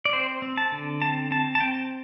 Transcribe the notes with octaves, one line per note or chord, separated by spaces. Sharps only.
D5
C4 C5
C4
A5
D3
C4 A5
C4 A5
A5
C4 G5